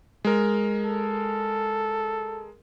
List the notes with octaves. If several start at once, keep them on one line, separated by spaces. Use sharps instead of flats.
G#3 A#4
A4